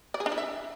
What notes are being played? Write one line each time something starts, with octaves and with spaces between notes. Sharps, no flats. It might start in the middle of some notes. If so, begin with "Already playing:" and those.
D5
G#4
D4
E4
E5